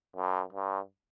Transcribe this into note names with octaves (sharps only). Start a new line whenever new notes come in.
F#2
G2